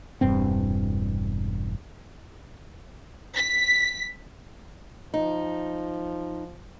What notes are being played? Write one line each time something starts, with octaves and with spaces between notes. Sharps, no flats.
E1 G2 C4
B6
F3 D#4